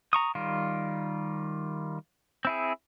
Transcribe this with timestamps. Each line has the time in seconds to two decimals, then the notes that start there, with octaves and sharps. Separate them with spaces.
0.13 A#5 C#6 D#6
0.35 D#3 G3 F4
2.45 C4 E4 G#4